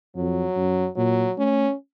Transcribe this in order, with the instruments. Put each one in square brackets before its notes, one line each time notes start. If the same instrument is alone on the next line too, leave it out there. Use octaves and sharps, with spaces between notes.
[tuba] F2 [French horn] F#3
[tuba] F#2
[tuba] A#2 [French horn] F#3
[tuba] A3 [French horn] C#4